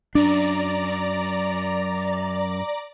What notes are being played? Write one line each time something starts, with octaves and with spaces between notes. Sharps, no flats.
F#2 D4 D5 A#5